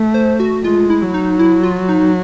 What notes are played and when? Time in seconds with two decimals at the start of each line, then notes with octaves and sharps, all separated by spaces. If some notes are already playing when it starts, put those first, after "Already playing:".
Already playing: A3
0.14 C5
0.40 F#4
0.64 G#3 F4
0.90 E4
1.02 F#3
1.14 D#4
1.39 E4
1.63 F4
1.89 D#4